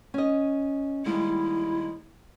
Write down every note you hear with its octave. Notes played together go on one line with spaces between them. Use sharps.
C#4 D#5
D#2 G3 G#3 E4